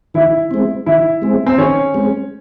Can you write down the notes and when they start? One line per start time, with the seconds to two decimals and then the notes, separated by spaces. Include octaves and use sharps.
0.14 D#3 E4
0.51 G#3 C4
0.86 D#3 E4
1.22 G#3 C4
1.46 C4
1.58 D#3 C#4
1.94 G#3 C4